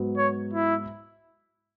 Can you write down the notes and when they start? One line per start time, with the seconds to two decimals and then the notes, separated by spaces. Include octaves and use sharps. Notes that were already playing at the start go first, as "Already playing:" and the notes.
Already playing: G#2 F#3 B3
0.18 C#5
0.54 E4